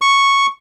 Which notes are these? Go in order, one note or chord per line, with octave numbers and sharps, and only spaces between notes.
C#6